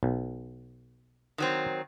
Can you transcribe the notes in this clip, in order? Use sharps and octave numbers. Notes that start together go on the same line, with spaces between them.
B1
D#3 F#3 C4